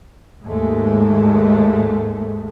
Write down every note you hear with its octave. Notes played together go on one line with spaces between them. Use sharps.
D#2 G#2 G#3 A3